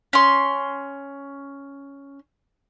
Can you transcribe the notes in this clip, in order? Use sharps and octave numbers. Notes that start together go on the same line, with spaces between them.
C#4 C6